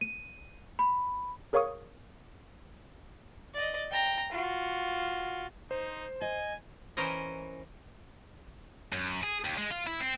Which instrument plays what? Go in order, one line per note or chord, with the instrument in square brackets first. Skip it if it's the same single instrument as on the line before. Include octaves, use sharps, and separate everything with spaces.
[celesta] D#7
B5
[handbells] G#4 A#4 C#5 F5 C#6 D#6
[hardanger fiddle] D5 D#5
G5 A#5
F4 F#4
[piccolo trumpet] D#4 [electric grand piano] C5
[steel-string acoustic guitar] D#5 [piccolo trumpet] G#5
[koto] E3 C#4 A#4 C5 D#5
[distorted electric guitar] F#2
G#4
D#2
G#3
F4
E4
C4